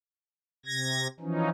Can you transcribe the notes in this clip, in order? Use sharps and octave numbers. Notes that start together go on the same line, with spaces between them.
C3 G#6 A#6
E3 F3 C#4 D#4